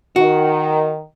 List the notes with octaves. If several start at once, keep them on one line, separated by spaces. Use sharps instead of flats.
D#3 F#4